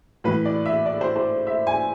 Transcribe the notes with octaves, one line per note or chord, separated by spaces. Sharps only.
A2 E3 B4
D5
E5
D5
C5
C5
E5
G#5